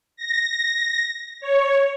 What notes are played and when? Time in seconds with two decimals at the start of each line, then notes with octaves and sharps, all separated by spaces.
0.17 A#6
1.41 C#5